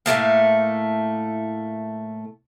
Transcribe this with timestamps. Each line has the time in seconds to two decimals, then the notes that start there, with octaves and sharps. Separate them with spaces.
0.06 A2 D#3 A3 A#3